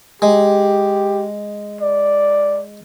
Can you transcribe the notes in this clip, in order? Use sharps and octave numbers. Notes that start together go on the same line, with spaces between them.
G#3 G4
D5